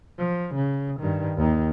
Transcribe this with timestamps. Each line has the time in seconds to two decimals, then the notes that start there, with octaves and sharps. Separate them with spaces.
0.19 F3
0.55 C#3
1.00 G2 D#3
1.37 D#2 D#3